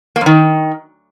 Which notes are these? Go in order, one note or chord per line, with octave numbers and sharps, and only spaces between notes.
A#3
F#2
D#3